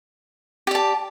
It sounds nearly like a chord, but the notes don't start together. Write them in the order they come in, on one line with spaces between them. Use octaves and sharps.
G4 D5 A5